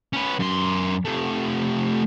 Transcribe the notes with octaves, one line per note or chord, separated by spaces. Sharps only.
C#4 B4
F#2 C6
C3 A3